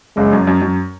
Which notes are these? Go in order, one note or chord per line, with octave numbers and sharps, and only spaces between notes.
F#1 G#3
F#2
F#2
F#2